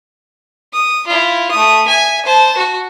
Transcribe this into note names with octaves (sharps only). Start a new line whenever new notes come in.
D#6
E4 F4
A3 D#6
E5 G#5
C5 A5
F#4